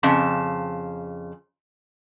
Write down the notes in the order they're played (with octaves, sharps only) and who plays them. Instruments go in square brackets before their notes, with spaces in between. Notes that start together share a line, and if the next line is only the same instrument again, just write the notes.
[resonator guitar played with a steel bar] F2 C#3 A5